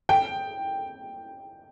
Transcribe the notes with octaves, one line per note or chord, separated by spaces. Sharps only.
G5